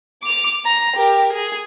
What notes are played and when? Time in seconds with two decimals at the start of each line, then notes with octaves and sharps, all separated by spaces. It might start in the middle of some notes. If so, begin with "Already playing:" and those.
0.23 D6 F7
0.65 A#5
0.97 G4 A#4
1.33 G#4